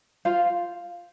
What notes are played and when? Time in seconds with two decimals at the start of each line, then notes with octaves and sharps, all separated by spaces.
0.25 F4 C5 F5